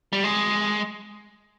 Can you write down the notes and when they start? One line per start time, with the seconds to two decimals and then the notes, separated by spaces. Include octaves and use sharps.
0.13 G3
0.24 G#3